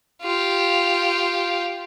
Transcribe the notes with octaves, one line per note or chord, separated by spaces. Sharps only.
F4 G4